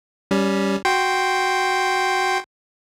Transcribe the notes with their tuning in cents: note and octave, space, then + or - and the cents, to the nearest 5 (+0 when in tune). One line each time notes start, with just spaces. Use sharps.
G3 +0 C#4 +15
F#4 +0 G5 +0 C6 +0